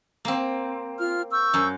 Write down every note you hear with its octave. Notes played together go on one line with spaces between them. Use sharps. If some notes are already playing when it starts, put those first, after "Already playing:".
A#3 C4
F4 F6
C#6 E6 G6
F#2